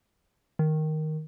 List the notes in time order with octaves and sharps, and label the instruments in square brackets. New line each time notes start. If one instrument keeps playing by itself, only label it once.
[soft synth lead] D#3